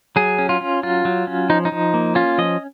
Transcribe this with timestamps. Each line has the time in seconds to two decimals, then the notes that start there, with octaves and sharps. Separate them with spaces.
0.16 F#3 G#4
0.38 C#4
0.49 F4
0.61 C#4
0.83 F#3 F4
1.05 F#3
1.27 C#4
1.50 F3 D#4
1.65 D#4
1.72 F3
1.94 A#3
2.15 C#4 F4
2.38 F3 D#5